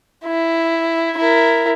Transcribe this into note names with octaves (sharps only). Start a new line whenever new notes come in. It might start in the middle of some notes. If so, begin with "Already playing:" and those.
E4
E4 A#4